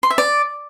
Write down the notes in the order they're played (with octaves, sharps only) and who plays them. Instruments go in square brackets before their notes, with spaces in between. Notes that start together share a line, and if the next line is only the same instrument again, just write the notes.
[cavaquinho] C6
E5
D5